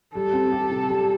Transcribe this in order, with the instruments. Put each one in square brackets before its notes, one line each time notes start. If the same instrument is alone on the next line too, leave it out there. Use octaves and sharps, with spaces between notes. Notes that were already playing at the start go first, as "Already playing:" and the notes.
[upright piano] G3 [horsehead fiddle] A4
[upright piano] C4
G4
C3
G3